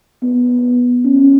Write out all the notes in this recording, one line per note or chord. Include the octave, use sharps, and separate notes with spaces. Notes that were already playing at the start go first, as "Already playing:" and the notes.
B3
C#4